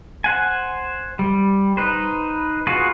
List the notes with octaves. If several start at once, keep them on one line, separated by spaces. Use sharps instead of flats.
C5 F#5 G#5
G3
D#4 B4 C5
F4 F#4 G#4 B4